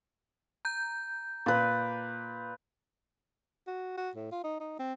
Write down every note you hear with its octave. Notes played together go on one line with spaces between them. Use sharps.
A#5 G6
A#2 B4 D5
F#4
F#4
A2
F4
D#4
D#4
C4